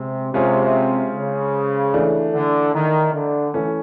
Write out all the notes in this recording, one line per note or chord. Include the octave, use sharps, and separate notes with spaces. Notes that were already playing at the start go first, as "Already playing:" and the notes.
Already playing: C3 G#3
C3 G#3 C#4 F4 G#4 C5
C#3
E3 A3 D4
D3
D#3
D3
E3 A3 C#4